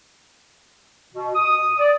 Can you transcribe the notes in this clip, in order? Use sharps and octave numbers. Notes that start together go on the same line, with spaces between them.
B2
D#6
D5